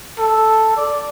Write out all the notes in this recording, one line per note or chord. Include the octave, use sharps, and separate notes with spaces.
A4
D5